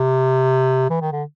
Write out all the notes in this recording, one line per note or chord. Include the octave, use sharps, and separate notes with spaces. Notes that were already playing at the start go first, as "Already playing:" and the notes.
Already playing: C3
E3
D#3
D3